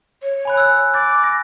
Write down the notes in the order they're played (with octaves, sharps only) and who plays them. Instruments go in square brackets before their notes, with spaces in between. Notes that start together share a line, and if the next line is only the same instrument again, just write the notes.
[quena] C#5
[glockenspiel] G#5 B5 F#6
E6 F#6
[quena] D6 [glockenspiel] G6 A6
[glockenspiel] A#6